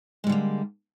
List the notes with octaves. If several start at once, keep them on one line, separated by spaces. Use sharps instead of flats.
D3 G3 G#3 A#3